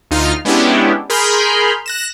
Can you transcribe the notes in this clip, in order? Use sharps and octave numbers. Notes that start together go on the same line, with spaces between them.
D2 D#4 F4 F6
G#3 B3 C#4 D4 E4 G4
G#4 A#4 B5 C6 F6 G6
F#6 A#6 E7